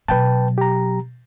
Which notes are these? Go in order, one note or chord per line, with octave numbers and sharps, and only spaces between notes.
B2 F#3 B4 G5 A5
G4 A#5